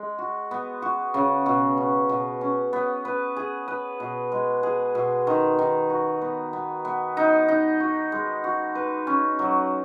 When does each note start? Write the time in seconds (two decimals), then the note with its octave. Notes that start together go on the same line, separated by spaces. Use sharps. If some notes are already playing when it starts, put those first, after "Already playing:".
Already playing: G#3
0.19 F#4
0.51 B3
0.82 F#4
1.14 C#3
1.46 B2
1.78 C#4
2.09 B2
2.41 C#4
2.73 B3
3.05 B4
3.37 G#4
3.68 B4
4.00 B2
4.32 G#3
4.63 G#4
4.95 B2
5.27 D#3
5.59 D#3
5.90 F#4
6.22 B3
6.53 B3
6.85 B3
7.17 D#4
7.48 D#4
7.80 F#4
8.12 G#3
8.44 F#4
8.75 B4
9.07 C#4
9.39 F#3